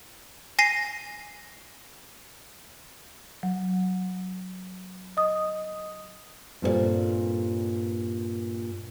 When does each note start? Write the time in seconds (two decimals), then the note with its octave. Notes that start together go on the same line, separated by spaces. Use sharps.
0.59 G#5 A#6 C7 D#7
3.43 F#3
5.17 D#5 D#6
6.62 G2 A#2 C4 F#4 A4 D5